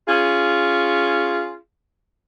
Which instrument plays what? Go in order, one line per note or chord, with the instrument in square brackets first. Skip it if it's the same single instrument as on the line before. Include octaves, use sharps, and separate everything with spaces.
[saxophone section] C#4 F4 G#4